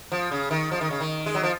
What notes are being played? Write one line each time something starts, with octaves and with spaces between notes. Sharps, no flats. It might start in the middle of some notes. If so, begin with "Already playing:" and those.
F3
C#3
D#3
F3
D#3
C#3
D#3
G#3
F#3
F3